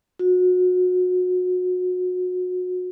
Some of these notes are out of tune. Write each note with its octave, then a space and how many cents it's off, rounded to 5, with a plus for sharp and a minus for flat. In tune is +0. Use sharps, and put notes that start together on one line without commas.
F#4 -25